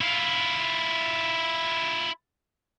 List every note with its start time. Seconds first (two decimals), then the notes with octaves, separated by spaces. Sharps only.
0.01 E4 F4